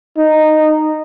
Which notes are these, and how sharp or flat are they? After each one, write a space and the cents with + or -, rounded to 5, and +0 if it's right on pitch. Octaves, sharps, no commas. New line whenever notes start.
D#4 -10